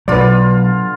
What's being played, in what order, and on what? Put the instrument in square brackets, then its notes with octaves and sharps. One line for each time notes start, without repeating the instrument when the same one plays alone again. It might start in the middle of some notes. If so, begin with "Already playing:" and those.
[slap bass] B2 F#3 [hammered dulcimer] D3 F4 [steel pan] B4 D5